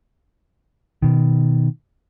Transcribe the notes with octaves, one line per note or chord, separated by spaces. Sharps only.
B2 D#3